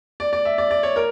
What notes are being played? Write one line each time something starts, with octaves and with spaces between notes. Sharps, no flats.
D5
D5
E5
D5
D5
C#5
A#4